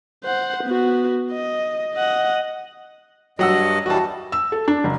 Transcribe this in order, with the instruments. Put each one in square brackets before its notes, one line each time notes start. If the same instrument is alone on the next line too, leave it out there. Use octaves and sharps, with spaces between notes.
[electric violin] C5 F#5
B3 F#4
D#5
D#5 F#5
[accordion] G2 D#5 [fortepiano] F#3 F#5 E6
[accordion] E3 G3 [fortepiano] F#4 A5
[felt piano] E6
A4
D4
F#1